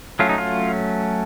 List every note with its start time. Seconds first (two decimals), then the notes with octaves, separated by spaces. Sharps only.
0.19 F#3 A3 C#4 F4
0.29 D#4
0.38 F4